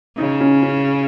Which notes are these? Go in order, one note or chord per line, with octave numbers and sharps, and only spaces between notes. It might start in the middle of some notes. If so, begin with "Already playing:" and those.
C#3 D#4
C#4
C#4